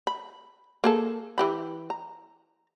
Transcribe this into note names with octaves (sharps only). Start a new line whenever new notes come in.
B5
A#3 G#4 A4
E3 G4 B5
A#5